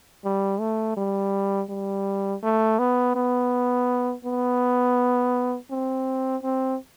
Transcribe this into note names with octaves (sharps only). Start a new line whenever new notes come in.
G3
A3
G3
G3
A3
B3
B3
B3
C4
C4